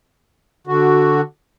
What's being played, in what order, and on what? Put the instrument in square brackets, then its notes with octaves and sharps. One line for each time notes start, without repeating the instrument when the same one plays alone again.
[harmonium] D3 F#4